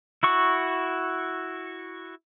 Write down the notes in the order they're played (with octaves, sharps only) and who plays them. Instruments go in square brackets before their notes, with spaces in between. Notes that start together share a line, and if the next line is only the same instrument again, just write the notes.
[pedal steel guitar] E4 F#4 C#6